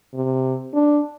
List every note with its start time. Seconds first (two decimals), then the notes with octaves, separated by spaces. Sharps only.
0.14 C3
0.74 D4